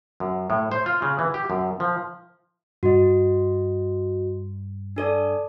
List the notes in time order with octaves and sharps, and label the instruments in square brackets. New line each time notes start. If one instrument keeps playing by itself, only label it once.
[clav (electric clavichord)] F#2
A2
C5
F4
C#3
E3
G4
F#2
F3
[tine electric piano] G2 [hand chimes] F#4 D#5
[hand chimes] D4 A4 D5